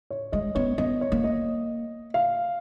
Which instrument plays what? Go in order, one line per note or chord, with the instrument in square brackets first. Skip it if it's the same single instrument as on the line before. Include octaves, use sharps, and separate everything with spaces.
[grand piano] C#5
[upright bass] G#3 [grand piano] D#5
[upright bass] B3 [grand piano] C#5
[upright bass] B3 [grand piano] D#5
[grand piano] C#5
[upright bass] A#3
[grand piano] D#5
F5